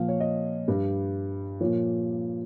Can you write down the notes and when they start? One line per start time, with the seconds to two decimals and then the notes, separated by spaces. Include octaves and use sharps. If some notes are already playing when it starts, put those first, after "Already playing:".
Already playing: A#2 F3 F5
0.09 C#5
0.20 D#5
0.68 G2 G3
1.61 A#2 F3 C#5